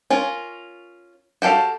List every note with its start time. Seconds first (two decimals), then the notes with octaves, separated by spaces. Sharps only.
0.10 C#4 F4 A#4
1.42 F#4 G4 A4 F5